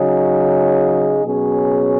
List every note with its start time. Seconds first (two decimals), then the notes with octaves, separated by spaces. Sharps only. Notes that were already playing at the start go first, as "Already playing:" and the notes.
Already playing: C#3 F#3 D#4 G#4
1.23 B2 F#3 C#4 G#4